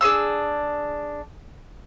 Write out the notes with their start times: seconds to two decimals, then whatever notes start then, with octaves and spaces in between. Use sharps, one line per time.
0.01 D4 G#4 C5 E6